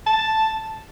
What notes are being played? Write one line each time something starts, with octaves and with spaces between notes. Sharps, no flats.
A5